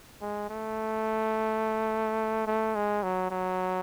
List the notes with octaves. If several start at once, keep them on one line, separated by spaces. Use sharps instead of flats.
G#3
A3
A3
G#3
F#3
F#3